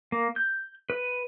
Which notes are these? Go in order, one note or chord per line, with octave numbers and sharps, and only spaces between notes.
A#3
G6
B4